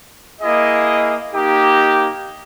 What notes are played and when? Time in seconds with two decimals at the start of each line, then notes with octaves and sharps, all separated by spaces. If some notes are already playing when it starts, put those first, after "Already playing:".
0.41 A#3 E4 G#4 D#5
1.34 A#3 D#4 G4